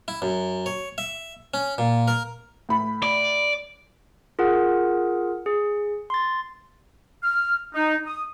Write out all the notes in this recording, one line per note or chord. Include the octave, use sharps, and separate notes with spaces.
E4
F#2
C#5
E5
C#4
A#2
A#4
A2 B5
D5
F4 G#4 A#4 F#5
G#4
C6 A6
F6
D#4
D#6